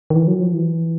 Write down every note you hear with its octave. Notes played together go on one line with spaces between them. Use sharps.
D#3
E3
F#3
F3
E3